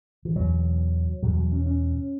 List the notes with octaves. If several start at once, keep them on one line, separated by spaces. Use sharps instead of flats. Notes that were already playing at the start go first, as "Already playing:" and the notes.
E3
E2 B2 F#3
E2 B2 F#3
F#3
C#4
C#4